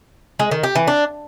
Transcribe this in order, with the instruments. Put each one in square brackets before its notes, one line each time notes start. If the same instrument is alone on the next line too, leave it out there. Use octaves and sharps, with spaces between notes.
[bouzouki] G#3
D#3
G4
E3
D4